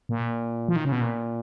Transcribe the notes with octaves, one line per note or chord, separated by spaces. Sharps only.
A#2
F3
D#3
C#3
B2
A#2